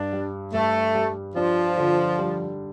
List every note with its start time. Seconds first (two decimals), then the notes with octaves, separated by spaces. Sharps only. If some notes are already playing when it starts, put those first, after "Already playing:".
Already playing: G2 D4
0.13 G3
0.53 G2 A3
0.95 G3
1.36 F3 D4
1.77 D3
2.19 G3